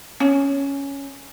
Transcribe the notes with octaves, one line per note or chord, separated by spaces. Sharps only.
C#4